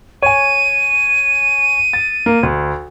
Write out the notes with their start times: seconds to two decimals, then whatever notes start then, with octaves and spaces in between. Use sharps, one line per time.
0.22 C#5 G#5 D#7
1.93 A6
2.26 A#3
2.43 D2